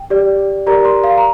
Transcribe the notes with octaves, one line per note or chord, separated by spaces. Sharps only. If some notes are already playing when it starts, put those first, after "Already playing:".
Already playing: G5
G4 D5
G4 A#4 D5 A#5
C6
F5
A#5